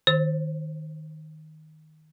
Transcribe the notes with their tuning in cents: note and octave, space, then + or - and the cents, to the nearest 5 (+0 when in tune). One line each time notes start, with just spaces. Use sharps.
D#3 +0 C5 +0